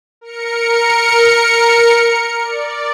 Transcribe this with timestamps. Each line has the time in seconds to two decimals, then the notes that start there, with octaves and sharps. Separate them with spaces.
0.21 A#4 C#7
2.41 D5